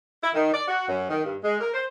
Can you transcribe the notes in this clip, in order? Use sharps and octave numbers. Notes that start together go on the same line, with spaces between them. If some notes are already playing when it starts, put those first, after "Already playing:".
E4
D#3
D5
F#4
F#2
D#3
G2
G#3
A#4
C5